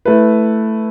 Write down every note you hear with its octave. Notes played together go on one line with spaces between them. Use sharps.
A3 E4 B4